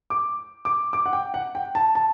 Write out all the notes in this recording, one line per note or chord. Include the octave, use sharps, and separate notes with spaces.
D6
D6
D6
F#5
G5
F#5
G5
A5
A5